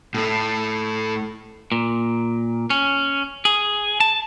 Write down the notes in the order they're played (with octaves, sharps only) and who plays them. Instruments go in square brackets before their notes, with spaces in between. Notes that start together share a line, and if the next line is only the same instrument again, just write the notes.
[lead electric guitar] A2 A3
[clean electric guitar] A#2
C#4
G#4
A5